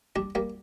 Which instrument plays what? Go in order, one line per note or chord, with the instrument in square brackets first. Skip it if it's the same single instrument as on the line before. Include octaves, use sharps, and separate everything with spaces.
[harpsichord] G3 D4
G3 A#3